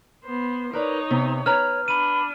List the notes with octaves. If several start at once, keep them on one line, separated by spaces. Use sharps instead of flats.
B3 C5
D#4 A#4 B4 C#5 D5
C3 B3
B4 C#5 A#5 F6
D4 B5 D#7